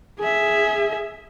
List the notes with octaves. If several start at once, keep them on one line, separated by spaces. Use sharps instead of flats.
G#4 E5